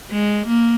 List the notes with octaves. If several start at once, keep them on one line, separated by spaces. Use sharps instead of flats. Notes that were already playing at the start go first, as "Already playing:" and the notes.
G#3
A#3